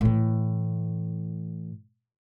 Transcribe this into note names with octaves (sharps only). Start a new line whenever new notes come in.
A2 E3